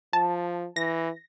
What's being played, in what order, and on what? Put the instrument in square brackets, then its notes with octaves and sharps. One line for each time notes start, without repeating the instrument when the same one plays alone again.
[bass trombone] F3 [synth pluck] A5
[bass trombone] E3 [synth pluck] A#6